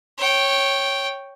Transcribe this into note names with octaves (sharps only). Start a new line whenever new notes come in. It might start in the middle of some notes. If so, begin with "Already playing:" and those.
C#5 G5